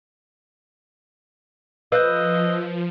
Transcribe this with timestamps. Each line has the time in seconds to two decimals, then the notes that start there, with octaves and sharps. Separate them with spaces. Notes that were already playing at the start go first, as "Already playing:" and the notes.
1.92 F3 B4 D#5 F5 E6 F#6 G6